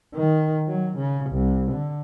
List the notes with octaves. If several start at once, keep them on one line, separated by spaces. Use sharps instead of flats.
D#3
F#3
C#3
C2
D3